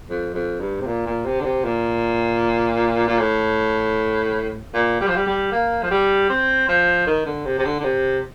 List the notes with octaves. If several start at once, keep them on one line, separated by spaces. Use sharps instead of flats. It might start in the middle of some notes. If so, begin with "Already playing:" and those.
F2
F2
G2
C3
A#2
A#2
C3
D3
C3
A#2
A#2
A2
A#2
G3
F3
G3
G3
A#3
F3
G3
C4
F3
D#3
D3
C3
C3
D3
D3
C3